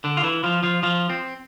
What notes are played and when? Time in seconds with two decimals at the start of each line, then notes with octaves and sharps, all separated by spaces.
0.04 D3 D4
0.17 F4
0.24 E3 E4
0.44 F3 F4
0.63 F3 F4
0.83 F3 F4
1.09 C4